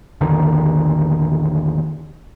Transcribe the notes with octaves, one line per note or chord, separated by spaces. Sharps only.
A#1 E2 D3 D#3